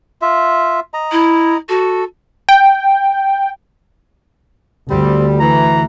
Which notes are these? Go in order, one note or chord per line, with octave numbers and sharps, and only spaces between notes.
F4 E5
D#5 A#5
E4
F#4 A4
G5
D2 G3 C4
E3 A#5